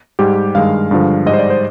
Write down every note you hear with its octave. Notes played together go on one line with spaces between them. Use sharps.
G#2 G3 G4
G2 D#3 G#3 F5
G2 D3 F3 G#3
G#2 G3 D#5
C5
D5
C5